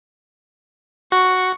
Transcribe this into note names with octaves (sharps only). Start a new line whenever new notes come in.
F#4 C#6